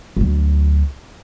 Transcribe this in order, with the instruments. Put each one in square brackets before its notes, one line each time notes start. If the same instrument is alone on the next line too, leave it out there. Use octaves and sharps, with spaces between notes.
[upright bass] D2 F#3